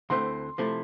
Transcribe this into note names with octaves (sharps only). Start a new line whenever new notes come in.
D2 D3 A3 C4 E4 C6
C3 F3 A3 E4